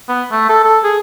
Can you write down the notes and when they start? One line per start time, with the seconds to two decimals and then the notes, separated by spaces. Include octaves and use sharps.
0.09 B3
0.32 A3
0.49 A4
0.64 A4
0.84 G#4